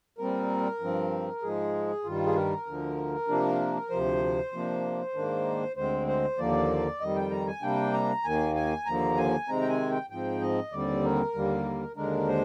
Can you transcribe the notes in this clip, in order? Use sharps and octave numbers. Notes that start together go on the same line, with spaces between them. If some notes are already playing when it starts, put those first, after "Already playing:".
A#2 G3 C4 A#4
G2 F3 C4
G#2 F3 G#3 G#4
G2 D#3 G3 F4
G#4
A#4
D2 D3 F3
C3 F3 A#3 D4
D2 C3 F3 C5
C3 F3 A#3 D4
G#2 D#3 A#3 D4
D2 D3 G#3 C4 C5
C5
D#2 D3 F3 A#3 D5
F2 D#3 G3 D#5
G5
A#5
G#5
C3 G3 A#3 D4 G5
A#5
D#2 D#3 A#3 G#5
G#5
D#2 D3 F3 A#3 A#5
G#5
C3 D#3 G#3 C4 A#5
G5
G#5
G5
G#2 F3 C4 G5
D#5
D#2 D3 G3 C4 D5
A#4
D#2 D3 G3 A#3
D#2 D3 G#3 D4 A#4
C5